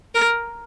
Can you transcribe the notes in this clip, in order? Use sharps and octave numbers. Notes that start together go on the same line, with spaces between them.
A#4